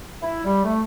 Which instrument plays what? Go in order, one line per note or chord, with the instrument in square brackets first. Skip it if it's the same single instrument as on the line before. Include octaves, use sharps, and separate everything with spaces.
[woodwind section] E4
G3
A3